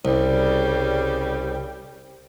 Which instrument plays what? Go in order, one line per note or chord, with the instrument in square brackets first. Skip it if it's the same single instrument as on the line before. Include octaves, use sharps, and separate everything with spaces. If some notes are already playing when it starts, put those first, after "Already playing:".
[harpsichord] C2 [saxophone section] C#3 G3